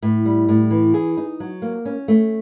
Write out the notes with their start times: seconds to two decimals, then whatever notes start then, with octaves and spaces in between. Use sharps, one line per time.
0.02 A2
0.25 G3
0.48 A2
0.71 E3
0.94 G#4
1.17 D#4
1.40 F#3
1.62 A#3
1.85 C#4
2.08 A3